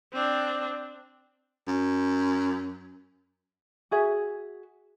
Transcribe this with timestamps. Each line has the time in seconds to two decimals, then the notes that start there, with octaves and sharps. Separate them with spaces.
0.13 C4 D4
1.67 F#2
3.91 F#4 G#4 E5